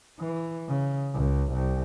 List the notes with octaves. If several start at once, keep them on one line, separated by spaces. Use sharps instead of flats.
E3
C#3
C#2
C2